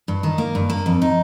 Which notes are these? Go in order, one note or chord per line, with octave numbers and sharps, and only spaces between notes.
G2
D#3
A#3
G2
A#3
F2
D#4